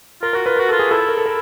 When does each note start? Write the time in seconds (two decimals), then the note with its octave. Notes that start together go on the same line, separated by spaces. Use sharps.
0.22 F4 A#4
0.33 F#4 A#4
0.46 F4 B4
0.56 F#4 A#4
0.69 F4 A4
0.79 G#4
0.91 E4 A4
1.09 A#4
1.17 A4
1.26 A#4